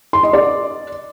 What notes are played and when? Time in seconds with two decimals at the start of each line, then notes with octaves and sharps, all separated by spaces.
0.13 C6
0.23 D#5
0.33 D5